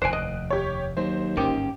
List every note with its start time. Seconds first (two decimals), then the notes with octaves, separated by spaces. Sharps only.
0.02 F1 D#2 C5 G#5 F#6 D7
0.13 D#5
0.50 G4 C#5
0.97 D#2 F#3 C5
1.37 G1 G#2 D#3 C#4 G4